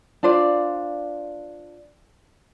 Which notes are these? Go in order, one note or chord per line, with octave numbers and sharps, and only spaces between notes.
D4 F4 C5 D5